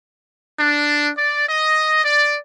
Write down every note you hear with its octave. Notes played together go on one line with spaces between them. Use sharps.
D4
D5
D#5
D5